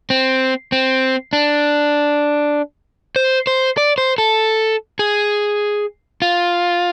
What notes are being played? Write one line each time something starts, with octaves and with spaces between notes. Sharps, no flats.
C4
C4
D4
C5
C5
D5
C5
A4
G#4
F4